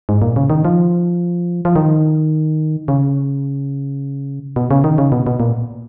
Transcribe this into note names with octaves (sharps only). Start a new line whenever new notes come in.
G#2
A#2
C#3
D#3
F3
F3
D#3
C#3
B2
C#3
D#3
C#3
B2
B2
A#2